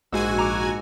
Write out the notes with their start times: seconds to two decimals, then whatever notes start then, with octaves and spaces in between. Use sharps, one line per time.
0.12 A#1 G#2 F#4 G#5 E6
0.38 A#5 D6